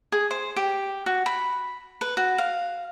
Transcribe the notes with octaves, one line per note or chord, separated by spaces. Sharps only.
G#4
C5
G4
F#4
B5
B4
F#4
F5